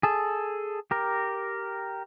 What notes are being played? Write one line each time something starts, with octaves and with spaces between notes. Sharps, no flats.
G#4 A4
G4 A#4